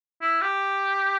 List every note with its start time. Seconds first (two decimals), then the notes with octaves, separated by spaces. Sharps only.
0.21 E4
0.41 G4